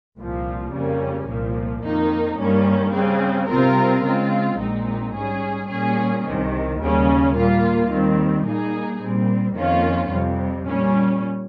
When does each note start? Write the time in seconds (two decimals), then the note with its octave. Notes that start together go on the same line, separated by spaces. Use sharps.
0.17 C2 A#2 F3
0.73 F2 C#3 G3 A#3 C#4
1.27 C2 A#2 F3 A#3
1.83 F2 D#3 A#3 D#4
2.39 G2 D#3 G3 A#3 C#4
2.93 C#3 G3 C4
3.48 C3 G3 C4 F4 A#4
4.04 C#3 G#3 C4 F4
4.59 A#1 A#2 G#3 C4 D#4
5.15 G#2 G3 C#4 G#4
5.69 A#2 G3 C#4 G#4
6.25 C2 C3 D#3
6.79 D#2 C#3 G3 C#4
7.35 A#2 G3 A#3 F4
7.90 D#2 D#3 G3 C4
8.45 A#2 G3 A#3 D#4 G#4
9.00 A#2 G3 C4
9.55 F2 D#3 A#3 C#4 F4
10.10 F2 C3 G3
10.67 A#2 G3 C#4